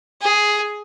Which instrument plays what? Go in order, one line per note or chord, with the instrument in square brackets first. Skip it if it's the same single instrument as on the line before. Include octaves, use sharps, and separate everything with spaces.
[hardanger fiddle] G#4